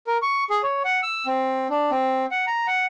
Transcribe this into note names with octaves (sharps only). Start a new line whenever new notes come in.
A#4
C#6
G#4
C#5
F#5
E6
C4
D4
C4
F#5
A#5
F#5